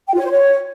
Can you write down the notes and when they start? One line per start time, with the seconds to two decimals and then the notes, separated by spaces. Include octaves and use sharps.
0.08 G5
0.14 F4
0.19 C#5
0.25 C5
0.31 C#5